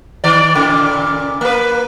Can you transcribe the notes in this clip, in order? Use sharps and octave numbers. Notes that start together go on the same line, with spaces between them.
D#3 D5
A#2 C#3
A#3 B4